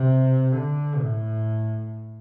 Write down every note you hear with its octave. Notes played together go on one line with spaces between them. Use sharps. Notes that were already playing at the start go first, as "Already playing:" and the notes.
Already playing: C3
D3
A2